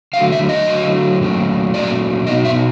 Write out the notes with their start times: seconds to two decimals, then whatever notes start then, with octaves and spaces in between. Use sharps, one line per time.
0.13 D3 F#3 A3 F5
0.32 E5
0.49 D#5
0.67 D3 F#3 A3
1.21 A#2 F#3 A3 C#4
1.74 A#2 F#3 A3 C#4 D5
2.27 B2 F#3 B3 D#4 D#5
2.45 E5